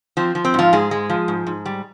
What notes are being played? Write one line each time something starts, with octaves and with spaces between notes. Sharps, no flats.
F3 C4
F3
C4
G#2 F3 F4
G#2 G#3 G#4
G#3
F3
G#2
G#2
G3